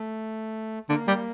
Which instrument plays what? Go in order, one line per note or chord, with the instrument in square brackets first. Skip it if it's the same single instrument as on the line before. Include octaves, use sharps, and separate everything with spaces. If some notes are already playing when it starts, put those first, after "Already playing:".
Already playing: [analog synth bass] A3
[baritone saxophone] D3 [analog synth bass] A#3
[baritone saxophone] G3